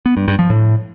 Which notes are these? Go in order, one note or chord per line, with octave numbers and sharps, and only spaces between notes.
B3
G2
G2
F3
A2